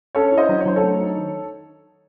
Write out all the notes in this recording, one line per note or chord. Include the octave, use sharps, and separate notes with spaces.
C#4 A4 C#5
E4
C5 D#5
F#3
C#5
F#3 C5
A4 C#5
A3
D#4
D#3